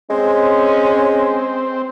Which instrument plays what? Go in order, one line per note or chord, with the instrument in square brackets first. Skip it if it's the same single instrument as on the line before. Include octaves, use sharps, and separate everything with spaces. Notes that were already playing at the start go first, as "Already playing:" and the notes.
[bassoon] G#3 [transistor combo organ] C4 [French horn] C#4